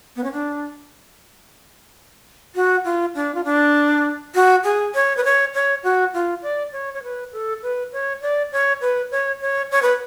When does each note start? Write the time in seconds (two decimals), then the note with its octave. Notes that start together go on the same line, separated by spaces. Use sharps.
0.16 B3
0.24 C#4
0.32 D4
2.55 F#4
2.85 F4
3.15 D4
3.34 F4
3.44 D4
4.35 F#4
4.64 G#4
4.95 C#5
5.17 B4
5.24 C#5
5.54 C#5
5.84 F#4
6.14 F4
6.43 D5
6.72 C#5
6.94 C#5
7.03 B4
7.33 A4
7.63 B4
7.93 C#5
8.22 D5
8.52 C#5
8.81 B4
9.11 C#5
9.41 C#5
9.71 C#5
9.82 B4